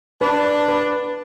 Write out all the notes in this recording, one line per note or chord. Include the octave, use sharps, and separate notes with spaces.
D4 B4
B4